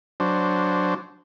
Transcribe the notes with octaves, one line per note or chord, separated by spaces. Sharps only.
F#3 D4 C5